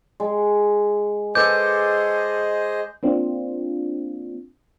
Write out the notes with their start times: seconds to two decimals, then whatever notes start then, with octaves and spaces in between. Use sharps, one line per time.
0.20 G#3
1.35 G#4 A4 B4 C5 D#5 D6 G6
3.03 A#3 C4 D4 F4